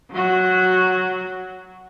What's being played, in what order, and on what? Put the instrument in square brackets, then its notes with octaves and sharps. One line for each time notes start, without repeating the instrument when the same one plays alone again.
[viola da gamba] F#3 F#4